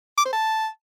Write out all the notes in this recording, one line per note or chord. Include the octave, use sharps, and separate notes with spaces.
D6
C5
A5